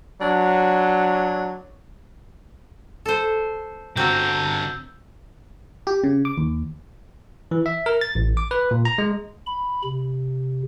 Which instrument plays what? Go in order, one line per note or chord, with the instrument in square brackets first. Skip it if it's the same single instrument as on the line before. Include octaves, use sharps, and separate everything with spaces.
[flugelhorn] F#3 [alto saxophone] D4
[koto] A4 C5
[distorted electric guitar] D3 G4 [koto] C4 F#4 [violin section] A#5 [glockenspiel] E6 G6
[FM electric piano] G4
C#3
D6
D#2
[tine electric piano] E3
E5
A#4
A6
A1
D6
B4
A#2
A#5
G#3
[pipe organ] B5
C3